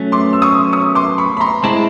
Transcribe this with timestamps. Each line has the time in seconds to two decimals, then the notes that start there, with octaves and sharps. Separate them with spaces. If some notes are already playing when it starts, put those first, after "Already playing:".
Already playing: F#3 A3 C#4
0.12 C6 D6
0.33 E6
0.42 C#6 D#6
0.72 C#6 D#6
0.95 C6 D6
1.18 B5 C#6
1.37 B5
1.40 A#5 C6
1.63 G#3 C4 E4 A5 B5